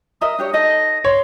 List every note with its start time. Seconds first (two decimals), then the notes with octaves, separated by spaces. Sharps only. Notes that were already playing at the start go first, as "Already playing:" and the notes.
0.21 A#4 D#5 E5 D#6
0.39 D4 G4 C#5
0.53 D#4 A4 D#5 A#6
1.04 C#5 C6